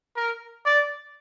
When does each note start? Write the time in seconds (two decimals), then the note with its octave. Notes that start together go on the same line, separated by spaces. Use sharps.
0.16 A#4
0.65 D5